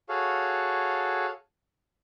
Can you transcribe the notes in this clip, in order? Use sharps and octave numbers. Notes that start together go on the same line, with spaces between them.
F#4 G#4 A4 C#5 F5